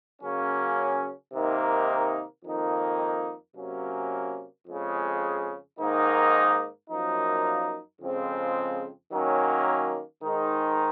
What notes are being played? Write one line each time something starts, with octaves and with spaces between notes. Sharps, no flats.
C#3 F#3 A#3 C#4
C3 D#3 A#3 D#4
F2 D#3 A#3 D#4
C3 F#3 A#3 C#4
F2 C#3 G#3
G#2 D#3 A#3 D#4
F#2 F3 A#3 D#4
F2 C#3 F3 G#3 C4
D#3 F#3 A#3 C#4
G#2 D#3 G#3 D#4